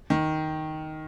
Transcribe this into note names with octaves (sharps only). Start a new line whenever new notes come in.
D#3